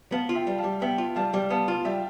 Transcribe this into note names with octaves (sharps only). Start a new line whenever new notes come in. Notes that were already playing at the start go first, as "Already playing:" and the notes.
B3 F5 A5
F4
E5 G5
G3
F5 A5
G3
B3 E5 G5
F4
G3 F5 A5
G3
B3 F5 A5
F4 F5 A5
G3 E5 G5